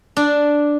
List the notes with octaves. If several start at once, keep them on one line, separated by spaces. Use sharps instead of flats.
D4